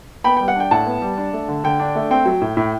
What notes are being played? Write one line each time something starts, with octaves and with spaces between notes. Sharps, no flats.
B3 G5 B5
G3 G5
F#5
D4 G5
A2 F#5 A5
B3
G3
D4
A3
D3
D3 G5
D4
A3
C4 G5
F#3
A2
A2